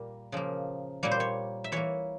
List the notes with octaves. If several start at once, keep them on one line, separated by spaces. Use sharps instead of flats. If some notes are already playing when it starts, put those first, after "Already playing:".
Already playing: A#2 G3 A#3
C#3 F3 A#3
A#2 G3 A#3 C#5
C5
C#5
E5
E3 A#3 C#5